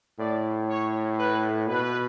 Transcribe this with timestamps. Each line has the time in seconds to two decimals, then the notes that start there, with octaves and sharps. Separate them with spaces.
0.19 A2 D5
0.69 C#5
1.19 B4
1.68 B2 B4